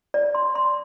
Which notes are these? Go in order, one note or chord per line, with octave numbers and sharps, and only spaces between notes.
D5
C6
C6